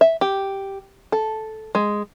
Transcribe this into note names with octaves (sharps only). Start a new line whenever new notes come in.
E5
G4
A4
G#3